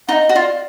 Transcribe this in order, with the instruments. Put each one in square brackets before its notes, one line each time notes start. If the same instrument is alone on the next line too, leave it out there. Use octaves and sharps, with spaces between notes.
[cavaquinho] D#4 [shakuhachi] F#5
[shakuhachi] D#5
[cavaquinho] F#4
[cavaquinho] F4 [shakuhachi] D5